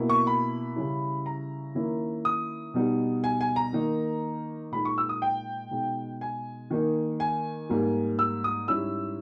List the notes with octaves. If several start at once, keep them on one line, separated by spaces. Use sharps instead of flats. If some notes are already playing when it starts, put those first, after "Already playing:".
Already playing: B2 A#3 E4
C#6
B5
C#3 G3 C#4 E4
A#5
D#3 A#3 C#4 E4
D#6
B2 G3 B3 D#4
G#5
G#5
A#5
D#3 A#3 D#4
A#2 G#3 D#4 B5
C#6
E6
D#6
G5
B2 G#3 D#4
G#5
D#3 A#3 D#4
G#5
G#2 G3 A#3
E6
D#6
G#2 G3 C#4 E4 E6